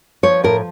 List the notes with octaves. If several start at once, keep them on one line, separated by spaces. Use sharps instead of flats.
F3 C#5
A2 A#4